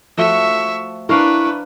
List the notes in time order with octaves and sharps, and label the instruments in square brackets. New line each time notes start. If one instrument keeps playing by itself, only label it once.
[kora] F3 A3 F#4 [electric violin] E5 C#6
[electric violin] D4 B4 [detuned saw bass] E4 [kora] A#4 F5 [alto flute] C#6